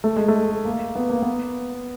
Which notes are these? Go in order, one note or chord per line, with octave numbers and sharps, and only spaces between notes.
A3
G#3
A3
A#3
B3
A#3
B3